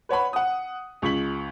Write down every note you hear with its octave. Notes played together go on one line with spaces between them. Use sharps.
B4 C#5 F#5 B5
F#5 D#6
C#2 C#6 B6 F#7